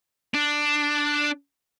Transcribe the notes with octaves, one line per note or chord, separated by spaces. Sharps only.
D4